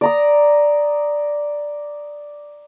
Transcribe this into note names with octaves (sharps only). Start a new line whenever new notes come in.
D5 A#5 D#6